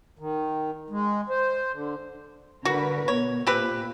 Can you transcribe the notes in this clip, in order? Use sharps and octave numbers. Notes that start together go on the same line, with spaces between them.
D#3
G#3
C5
D3
D3 F#4 A#4 B4
B2 C#5
A#2 C4 G4 B4